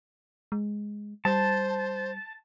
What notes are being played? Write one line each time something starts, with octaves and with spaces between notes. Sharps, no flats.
G#3
G3 C5 A5